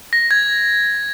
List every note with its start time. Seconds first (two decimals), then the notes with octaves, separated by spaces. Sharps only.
0.13 A#6
0.31 G#6